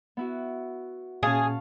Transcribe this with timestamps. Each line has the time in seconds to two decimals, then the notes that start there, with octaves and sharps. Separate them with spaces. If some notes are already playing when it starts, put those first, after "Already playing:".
0.17 B3 E4 F#4
1.23 A#2 C#4 G#4 F5 A5 C#6